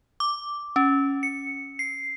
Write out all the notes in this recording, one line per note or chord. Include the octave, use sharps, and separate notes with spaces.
D6
C#4
C#7
C7